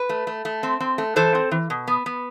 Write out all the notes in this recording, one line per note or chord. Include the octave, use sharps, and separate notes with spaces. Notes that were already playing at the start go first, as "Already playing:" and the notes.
Already playing: B4
A3
A3
A3
C4
C4
A3
E3 A4 C5
C4
E3
B2
B3
B3